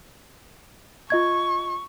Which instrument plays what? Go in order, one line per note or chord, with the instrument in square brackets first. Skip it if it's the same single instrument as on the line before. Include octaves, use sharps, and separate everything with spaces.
[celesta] F4 D#5 G#6 [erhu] C#6